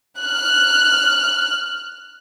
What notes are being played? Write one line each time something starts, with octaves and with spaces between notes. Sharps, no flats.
F6 F#6